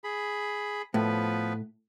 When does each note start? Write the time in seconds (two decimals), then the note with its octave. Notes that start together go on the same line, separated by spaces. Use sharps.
0.04 G#4 B5
0.94 A2 F3 B3 B4